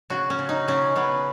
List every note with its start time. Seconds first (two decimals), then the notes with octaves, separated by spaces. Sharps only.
0.10 C#3 F#4
0.30 C#4
0.39 C#3
0.49 D#4
0.68 C#3 C#4
0.96 C#3 B3